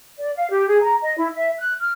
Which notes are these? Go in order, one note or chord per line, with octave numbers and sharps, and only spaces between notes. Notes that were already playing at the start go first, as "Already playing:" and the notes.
D5
F5
G4
G#4
A#5
D#5
E4
E5
F#6
F6